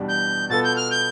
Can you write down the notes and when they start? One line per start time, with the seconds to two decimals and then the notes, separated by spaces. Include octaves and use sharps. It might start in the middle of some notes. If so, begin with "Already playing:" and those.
Already playing: E2 B2 G3 D4 G4
0.08 G6
0.50 B2 B3 F4 A4 A6
0.64 G6
0.76 F6
0.91 G6